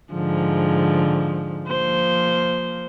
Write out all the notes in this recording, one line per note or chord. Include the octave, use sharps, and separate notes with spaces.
G#2 D3 F3
F3 A#3 C5